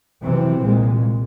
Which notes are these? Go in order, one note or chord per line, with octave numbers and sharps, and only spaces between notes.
B1 C3 E3 C4
C2 A#2 G#3